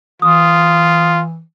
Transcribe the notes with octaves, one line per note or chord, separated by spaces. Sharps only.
E3 F4 D#6